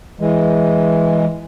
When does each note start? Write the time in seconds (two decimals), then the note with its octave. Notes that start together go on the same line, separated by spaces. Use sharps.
0.20 E3 G#3